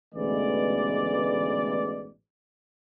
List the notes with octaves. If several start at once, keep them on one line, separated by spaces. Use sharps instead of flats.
A1 D2 G#2 B2 E3 D5